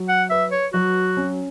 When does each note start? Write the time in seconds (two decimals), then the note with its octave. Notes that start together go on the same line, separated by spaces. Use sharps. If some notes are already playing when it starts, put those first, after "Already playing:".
Already playing: F#3
0.09 F#5
0.30 B4 E5
0.52 C#5
0.73 F#3 F#4
1.17 C#4